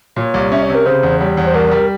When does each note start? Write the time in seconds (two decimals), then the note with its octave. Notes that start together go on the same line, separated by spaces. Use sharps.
0.16 A#2 C#5
0.34 C2
0.51 C#4 E5
0.62 C#5
0.69 C3
0.74 A#4
0.86 C#3 C5
1.03 E2
1.20 G3 C#5
1.37 E2 C#5
1.46 C5
1.54 C2 A#4
1.71 G3